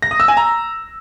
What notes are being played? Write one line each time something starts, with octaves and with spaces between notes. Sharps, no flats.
A#6
D#6
E6
G#5
A#5